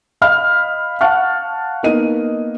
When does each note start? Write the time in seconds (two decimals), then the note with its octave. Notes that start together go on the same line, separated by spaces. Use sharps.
0.22 D#5 F5 B5 F6
1.01 F5 F#5 A5 C#6 F6 F#6
1.83 A#3 B3 D#4 D#5 D#7